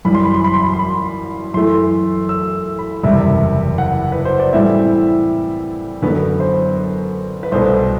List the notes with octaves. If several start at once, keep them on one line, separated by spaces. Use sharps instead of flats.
F#2 E3 G3 B5
C6
B5
C6
B5
C6
B5
C6
B5
F#2 E3 A3 C6
E6
B5
F#1 E2 C3 G3 E5
F#5
B4
C5
D5
A2 E3 G3 C4 E4 E5
F#2 D3 F#3 B3 B4
C5
B4
C2 B2 A3 C5